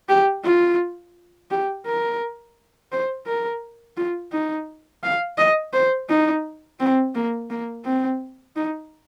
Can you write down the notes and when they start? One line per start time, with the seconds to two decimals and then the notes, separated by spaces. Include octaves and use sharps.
0.09 G4
0.45 F4
1.51 G4
1.86 A#4
2.92 C5
3.27 A#4
3.97 F4
4.33 D#4
5.04 F5
5.38 D#5
5.73 C5
6.10 D#4
6.80 C4
7.15 A#3
7.50 A#3
7.85 C4
8.56 D#4